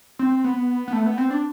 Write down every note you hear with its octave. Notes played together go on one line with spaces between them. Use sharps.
C4
B3
B3
A3
B3
C4
D4